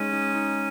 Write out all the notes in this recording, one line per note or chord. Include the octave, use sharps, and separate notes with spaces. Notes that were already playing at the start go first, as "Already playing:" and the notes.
Already playing: G#3 C#4 D#4
D#4
D#4